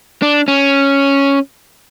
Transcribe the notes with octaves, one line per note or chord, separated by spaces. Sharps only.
D4
C#4